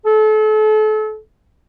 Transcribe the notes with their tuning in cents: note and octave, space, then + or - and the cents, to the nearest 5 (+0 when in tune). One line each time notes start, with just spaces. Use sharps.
A4 -35